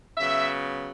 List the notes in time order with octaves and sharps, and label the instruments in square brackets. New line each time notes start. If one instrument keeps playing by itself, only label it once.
[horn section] C#3 F#3 B3 E5